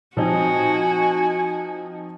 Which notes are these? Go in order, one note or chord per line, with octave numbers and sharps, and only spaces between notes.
A#2 F3 C4 D#4 F#4 G#5